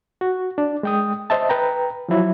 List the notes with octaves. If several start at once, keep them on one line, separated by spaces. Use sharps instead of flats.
F#4
D4
G#3 G5 D#6
C5 D#5 E5 A5
B4 G5 A#5
F3 F#3 E4